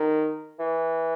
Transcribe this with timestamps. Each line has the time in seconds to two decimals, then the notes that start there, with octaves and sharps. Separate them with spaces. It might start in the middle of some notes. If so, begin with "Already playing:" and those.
Already playing: D#3
0.59 E3